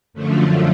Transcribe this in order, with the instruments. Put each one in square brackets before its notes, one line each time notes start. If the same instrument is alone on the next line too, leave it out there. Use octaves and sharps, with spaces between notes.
[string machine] F#2 D3 F3 A3